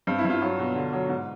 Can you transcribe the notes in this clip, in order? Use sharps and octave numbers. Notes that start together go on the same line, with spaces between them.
G2 C4
E4
G2 F4
F#3 F4
B2
D3
F#3
G#2